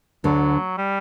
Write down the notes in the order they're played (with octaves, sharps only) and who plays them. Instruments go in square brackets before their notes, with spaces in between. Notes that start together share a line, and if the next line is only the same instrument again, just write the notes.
[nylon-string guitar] D2 D3 [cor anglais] F#3
[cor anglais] G3